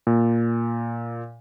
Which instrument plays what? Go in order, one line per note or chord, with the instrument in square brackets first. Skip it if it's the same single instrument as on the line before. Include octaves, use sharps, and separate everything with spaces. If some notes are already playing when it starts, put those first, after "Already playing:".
[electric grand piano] A#2